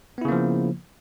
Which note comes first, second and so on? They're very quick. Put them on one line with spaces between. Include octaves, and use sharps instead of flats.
B3 E4 C#3 A#3 F3